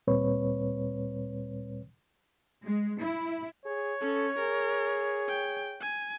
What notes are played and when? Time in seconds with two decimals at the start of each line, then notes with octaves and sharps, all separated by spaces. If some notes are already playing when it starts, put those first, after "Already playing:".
0.07 D2 A#2 G3 C4 B4 C#5
2.65 G#3
3.02 E4
3.65 G#4 C#5
4.01 C#4 A4
4.39 G#4 A#4
5.29 G5
5.81 G#5